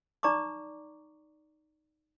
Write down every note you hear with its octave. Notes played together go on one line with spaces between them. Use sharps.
D#4 D5 A#5 C#6 D6